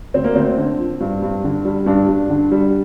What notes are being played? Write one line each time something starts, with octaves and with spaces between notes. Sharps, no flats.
D2 C4
A#3
D2 C4
D3
F3
G2
G2
D3
G3
G2 D4
G2
D3
G3